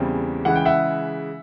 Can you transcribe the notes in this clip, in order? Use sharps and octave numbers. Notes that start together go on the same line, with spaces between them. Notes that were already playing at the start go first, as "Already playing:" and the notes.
Already playing: E2 C#3 E3 G3 C4
C#3 E3 G#3 F#5
G5
E5 F#5